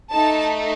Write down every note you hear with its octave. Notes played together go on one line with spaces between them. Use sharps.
A3 D#4 A4 A5